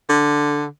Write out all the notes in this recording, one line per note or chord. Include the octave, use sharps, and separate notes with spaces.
D3